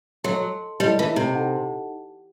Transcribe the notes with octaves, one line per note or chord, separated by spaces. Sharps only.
F#3 A4 D#5 A5 C6
G3 E4 A4 D#5 A5
E3
C3
D#4 A4 D#5 F#5 A5